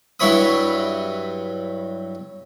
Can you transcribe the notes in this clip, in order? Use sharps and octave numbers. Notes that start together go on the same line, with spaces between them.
G2 F#3 E4 C#5 B5 D#6